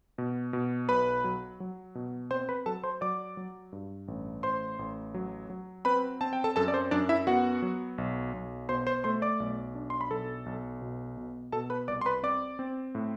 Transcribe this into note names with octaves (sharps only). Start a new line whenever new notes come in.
B2
B2
B1 B4 B5
F#3
F#3
B2
C4 C5 C6
B4 B5
F#3 A4 A5
C5 C6
F#3 D5 D6
F#3
G2
A1
A1 C5 C6
A1
F#3
F#3
C4 B4 B5
C4 A5
G5
A4 A5
F#2 A4 A5
D5
C5
F#2 D4 D5
E4 E5
B3 F#4 F#5
F#3
B1
B1
B2 C5 C6
C5 C6
A3 C5 C6
D5 D6
B1
D4
C6
B5
B1 A4 A5
B1
B2
B2
B2 A4 A5
B4 B5
C2 D5 D6
C6
B4 B5
C4 D5 D6
C4
A2